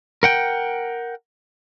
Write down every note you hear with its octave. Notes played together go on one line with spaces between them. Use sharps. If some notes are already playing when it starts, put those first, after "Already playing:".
A#4 F#5 G5